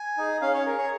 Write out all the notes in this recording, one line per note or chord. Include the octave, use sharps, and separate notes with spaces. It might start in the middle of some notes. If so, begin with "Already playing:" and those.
Already playing: G#5
D#4 G#4
C#4 F5
C#5
G#4 A#4
C#5